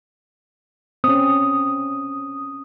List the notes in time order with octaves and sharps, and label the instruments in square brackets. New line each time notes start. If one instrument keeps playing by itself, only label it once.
[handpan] C4 C#4 [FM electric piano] D#6